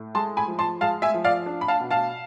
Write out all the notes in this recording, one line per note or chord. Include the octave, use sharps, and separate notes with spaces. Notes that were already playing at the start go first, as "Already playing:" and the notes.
Already playing: A2
G#3 A5 C6
G#5 B5
F3
A5 C6
G#3 F5 A5
E5 G#5
F3
D5 F5
D4
B5
F5 A5
B2
F5 A5